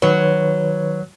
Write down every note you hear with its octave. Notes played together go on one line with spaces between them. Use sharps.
D#3 F#3 B4 C#5